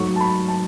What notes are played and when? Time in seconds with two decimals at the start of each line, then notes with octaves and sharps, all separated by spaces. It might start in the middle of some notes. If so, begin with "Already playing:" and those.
Already playing: G#2 F#3 A3 C#6
0.16 A5
0.21 B5
0.48 A5